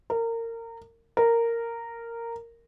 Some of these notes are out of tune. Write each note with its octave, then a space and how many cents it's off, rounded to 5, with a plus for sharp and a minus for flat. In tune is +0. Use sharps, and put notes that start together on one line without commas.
A#4 -25
A#4 -10